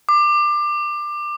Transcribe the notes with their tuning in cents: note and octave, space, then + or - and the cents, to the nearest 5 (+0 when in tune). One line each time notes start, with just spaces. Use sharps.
D6 +20